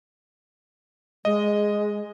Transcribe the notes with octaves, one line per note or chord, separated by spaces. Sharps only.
G#3 D#5